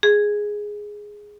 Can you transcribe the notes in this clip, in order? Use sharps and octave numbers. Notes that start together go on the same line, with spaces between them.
G#4